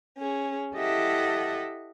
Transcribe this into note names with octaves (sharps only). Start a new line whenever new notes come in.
C#4 G#4
E4 G4 A4 D#5 E5 F#5